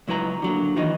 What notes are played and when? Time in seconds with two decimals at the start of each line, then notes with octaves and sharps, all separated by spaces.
0.08 C#2 F#3 E4 B4 A#5
0.42 D3 F#3 A#3
0.76 D#3 E3 F#3 D#4